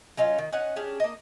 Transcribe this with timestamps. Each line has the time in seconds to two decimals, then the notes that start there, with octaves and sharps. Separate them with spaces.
0.17 F#3 C#4 D#4 F4
0.38 D#3
0.52 C#4 D#4 F#5 G#5
0.76 C#4 D4 G4 G#4
1.00 A#3 D#5